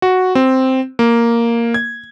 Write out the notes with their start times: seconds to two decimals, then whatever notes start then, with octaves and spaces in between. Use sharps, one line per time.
0.02 F#4
0.35 C4
0.99 A#3
1.74 G#6